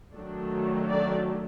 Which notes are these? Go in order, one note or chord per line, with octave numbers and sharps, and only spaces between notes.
D#3 F#3 A3 D4
D4 D5